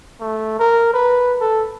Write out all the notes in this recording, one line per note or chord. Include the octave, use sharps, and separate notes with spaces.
A3
A#4
B4
A4